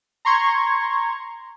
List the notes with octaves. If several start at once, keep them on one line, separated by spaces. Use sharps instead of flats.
A#5 C6 C#6 G#6